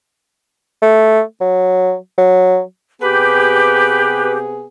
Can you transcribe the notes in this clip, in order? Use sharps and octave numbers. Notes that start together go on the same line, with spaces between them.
A3
F#3
F#3
C3 B3 G4 G#4 B4